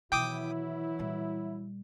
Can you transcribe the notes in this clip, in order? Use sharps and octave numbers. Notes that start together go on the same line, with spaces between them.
B2 D#3 E3 F#3 E4 G5 D6 D#6
A#2 G3